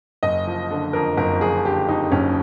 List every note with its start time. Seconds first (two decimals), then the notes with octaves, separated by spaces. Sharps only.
0.23 F#1 D#5
0.47 F3
0.71 D3
0.93 F2 A#4
1.17 F#1 A#4
1.41 F3 G#4
1.64 D3 G4
1.89 F2 D#4
2.12 F#1 C#4